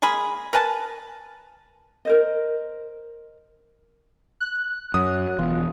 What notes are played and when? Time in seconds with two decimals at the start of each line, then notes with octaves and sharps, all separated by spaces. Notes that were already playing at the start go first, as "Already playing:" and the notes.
0.02 G#3 A#3 G#4 B5
0.53 A#4 B4 G#5 A5
2.05 A#4 C5 D#5
4.40 F#6
4.94 F#2 F#3 D#6
5.39 E1 E2 F4